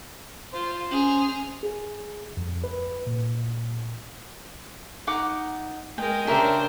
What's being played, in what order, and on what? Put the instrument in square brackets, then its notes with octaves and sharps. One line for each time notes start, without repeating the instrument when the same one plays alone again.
[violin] F4 [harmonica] C5
[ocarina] C#4 [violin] G#4 F7
[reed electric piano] G#4
F2
B4
A#2
[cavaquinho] D#4 F#5 D6
[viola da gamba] G#3 A#4 [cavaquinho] G5
[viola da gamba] C#3 D4 C5 [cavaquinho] G4 A#4 E5